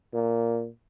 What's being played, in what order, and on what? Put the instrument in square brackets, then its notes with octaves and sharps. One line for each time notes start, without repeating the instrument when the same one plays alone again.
[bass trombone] A#2